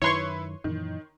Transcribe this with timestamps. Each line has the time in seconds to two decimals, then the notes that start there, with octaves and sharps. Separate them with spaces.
0.02 F#2 D#3 E4 B4 C#5 C6 C#6
0.64 F#2 A#2 D#3 E3